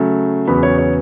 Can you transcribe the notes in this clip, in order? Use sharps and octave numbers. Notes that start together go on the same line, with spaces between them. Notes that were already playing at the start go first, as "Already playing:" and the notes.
Already playing: C#3 F#3 A3
E2 C#3 F#3 B3 B5
C#5
C#5